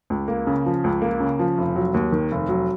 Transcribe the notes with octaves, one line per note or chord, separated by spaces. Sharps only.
C#2
A#3
C#3
F3
C#2
A#3
C#3
F3
F1
F#3
D#2
D#3
F1
F#3